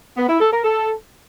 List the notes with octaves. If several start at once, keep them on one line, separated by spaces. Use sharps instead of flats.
B3
E4
A4
A#4
A4